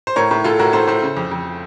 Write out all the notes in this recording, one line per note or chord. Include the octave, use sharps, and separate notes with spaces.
C5
A2 A#4 C#5
A2
A2 F4 A4
A2 F#4 A#4
A2 A4 C5
A2 A4 C5
C#3
F2
F2